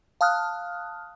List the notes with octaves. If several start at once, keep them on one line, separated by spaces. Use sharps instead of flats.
F5 A5 D#6 F6 F#6